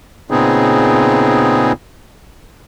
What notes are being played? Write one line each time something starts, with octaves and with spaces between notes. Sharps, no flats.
A#2 C#3 B3 C4 D#4 G#4